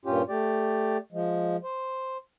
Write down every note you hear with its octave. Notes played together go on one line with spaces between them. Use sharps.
G2 A#2 C#4 F4 G4
A3 G4 D5
F3 G#3
C5